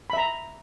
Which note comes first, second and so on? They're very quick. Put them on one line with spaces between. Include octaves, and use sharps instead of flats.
B5 E5 A#5